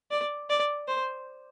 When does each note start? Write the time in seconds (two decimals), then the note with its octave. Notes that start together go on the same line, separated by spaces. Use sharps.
0.11 D5
0.50 D5
0.88 C5